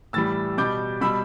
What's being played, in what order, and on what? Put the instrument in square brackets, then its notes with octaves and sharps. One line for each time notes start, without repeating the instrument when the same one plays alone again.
[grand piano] A2 E3 G3 E6 A6
B2 G3 D6 G6
B2 G3 B5 E6